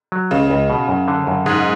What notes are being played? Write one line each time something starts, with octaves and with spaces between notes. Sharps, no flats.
F#3
C#2 C#3
C#2
B2
F#2
D3
F#2
G#2 G#3